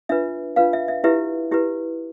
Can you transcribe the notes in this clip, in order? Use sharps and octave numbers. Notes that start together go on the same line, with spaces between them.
D4 F4 B4 E5
D4 F4 B4 F5
E5
E5
E4 G4 B4 E5
E4 G4 B4